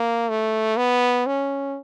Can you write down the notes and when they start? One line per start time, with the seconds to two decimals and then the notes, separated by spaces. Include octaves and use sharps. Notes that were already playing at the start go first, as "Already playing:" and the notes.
Already playing: A#3
0.29 A3
0.77 B3
1.27 C#4